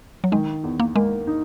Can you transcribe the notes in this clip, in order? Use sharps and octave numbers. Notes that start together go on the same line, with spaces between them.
F#3
D#3 G#3
E2
A#3
G#3 A#3
D#4